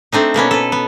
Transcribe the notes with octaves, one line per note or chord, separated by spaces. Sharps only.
A3 C4 D4 D#4
B2 A#3 B3 C#4
A4 B4
B3